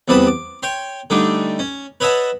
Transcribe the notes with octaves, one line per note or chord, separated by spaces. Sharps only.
E2 C3 G3 B4 A5 D#6
D6
C#5 G5 C6
D3 G3 A3 D4 D#4
C#4
B4 C#5 D#5 E5 F#5 A5